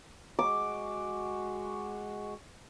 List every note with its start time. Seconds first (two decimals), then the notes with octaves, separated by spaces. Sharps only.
0.39 G#3 F#4 D6